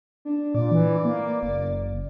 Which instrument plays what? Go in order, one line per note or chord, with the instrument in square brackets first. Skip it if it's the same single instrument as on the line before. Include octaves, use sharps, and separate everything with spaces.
[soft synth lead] D4
[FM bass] A#2 [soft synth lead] D5
[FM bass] E3
A#3
F#1